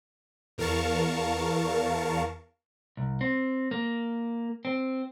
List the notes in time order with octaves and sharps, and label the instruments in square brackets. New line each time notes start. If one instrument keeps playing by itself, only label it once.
[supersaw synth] E2 A#4 F5 A5 C#6
[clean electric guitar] C2
C4
A#3
C4